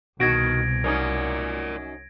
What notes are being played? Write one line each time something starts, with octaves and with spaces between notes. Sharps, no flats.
C2 B2 D#3 F#4 G#6 A#6 D7
F#2 C#4 D#4 A#4 D5